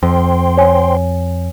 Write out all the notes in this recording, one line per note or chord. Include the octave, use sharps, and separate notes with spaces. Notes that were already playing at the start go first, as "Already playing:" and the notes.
F2 C5 G5 C6
C#5 G#5